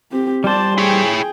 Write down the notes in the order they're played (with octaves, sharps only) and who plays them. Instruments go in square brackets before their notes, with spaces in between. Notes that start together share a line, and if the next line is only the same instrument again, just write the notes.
[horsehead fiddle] C4 G4
[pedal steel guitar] G3 C5 [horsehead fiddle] D5 A5
[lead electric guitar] E4 C#5 [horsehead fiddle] G#4 G5